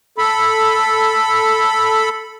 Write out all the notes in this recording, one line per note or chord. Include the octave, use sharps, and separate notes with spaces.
A4 B5